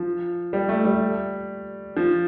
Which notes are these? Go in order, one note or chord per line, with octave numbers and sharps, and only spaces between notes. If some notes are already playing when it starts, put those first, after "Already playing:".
Already playing: F3
G3
A3
G3
F3